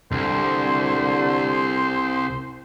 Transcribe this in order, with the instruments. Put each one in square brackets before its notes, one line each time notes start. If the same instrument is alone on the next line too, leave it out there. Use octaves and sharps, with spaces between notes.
[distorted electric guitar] C2 [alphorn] D3 [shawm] C5